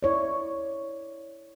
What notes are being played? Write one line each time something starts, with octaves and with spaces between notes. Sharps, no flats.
E4 C#5 D5